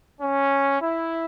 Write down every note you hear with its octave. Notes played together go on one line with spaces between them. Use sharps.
C#4
E4